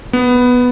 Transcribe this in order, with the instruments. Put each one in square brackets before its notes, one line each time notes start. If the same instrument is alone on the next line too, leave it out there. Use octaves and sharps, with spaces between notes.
[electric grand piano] B3